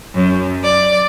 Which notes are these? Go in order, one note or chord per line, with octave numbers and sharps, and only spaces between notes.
F#2
D5